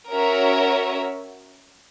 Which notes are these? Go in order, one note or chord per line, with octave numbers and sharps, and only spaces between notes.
C#4 F#4 A#4 C#5 E5